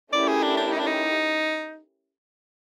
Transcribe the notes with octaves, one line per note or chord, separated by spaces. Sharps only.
A3 C#4 E4 G4 A#4 D5
G#4
D4
D4
D#4
D4
D#4